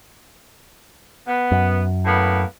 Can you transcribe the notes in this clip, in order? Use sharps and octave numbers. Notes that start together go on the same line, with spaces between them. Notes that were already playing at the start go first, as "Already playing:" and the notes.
B3
F#2
A2 A#3 B3